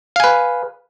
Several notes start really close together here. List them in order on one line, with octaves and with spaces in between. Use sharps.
F5 G#5 B4